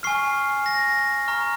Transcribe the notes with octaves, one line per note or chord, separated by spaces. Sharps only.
G#5 C#6 F6 C7
A#6
A#5 C#6 F6